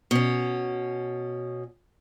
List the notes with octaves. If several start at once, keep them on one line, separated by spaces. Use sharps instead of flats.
B2 C#4